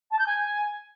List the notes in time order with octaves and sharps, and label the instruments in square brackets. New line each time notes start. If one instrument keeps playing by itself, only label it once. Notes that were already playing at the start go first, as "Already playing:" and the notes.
[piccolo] A5
G6
G#5